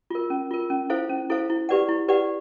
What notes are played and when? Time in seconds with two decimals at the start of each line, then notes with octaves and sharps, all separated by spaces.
0.10 F4 A#4
0.30 C#4
0.51 F4 A#4
0.70 C#4
0.90 E4 A4 C5 F5
1.09 C#4
1.30 E4 A4 C5 F5
1.50 E4
1.69 G4 B4 D5 F#5
1.89 E4
2.08 G4 B4 D5 F#5